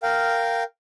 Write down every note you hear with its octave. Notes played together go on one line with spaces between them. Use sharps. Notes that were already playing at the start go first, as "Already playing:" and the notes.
A#4 F5 G5